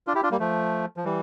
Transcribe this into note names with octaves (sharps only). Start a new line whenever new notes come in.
D4 F4
E4 G4
D4 F4
G3 A#3
F3 A3
F3
E3 G3